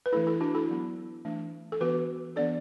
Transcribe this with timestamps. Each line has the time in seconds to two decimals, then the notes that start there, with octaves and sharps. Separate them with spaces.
0.06 B4
0.13 E3 A3 D4 E4 A4
0.27 E4 A4
0.41 D4 F#4
0.55 E4 A4
0.69 F#3 B3 D4
1.25 E3 A3 D4
1.72 A4
1.80 E3 B3 D4 F#4 B4
2.36 E3 B3 D4 A4 D5